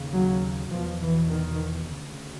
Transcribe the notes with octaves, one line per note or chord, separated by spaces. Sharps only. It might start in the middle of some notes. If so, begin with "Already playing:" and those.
Already playing: D#2 C#3
F#3
E2 B2 F3
E3
D#3
D2 C#3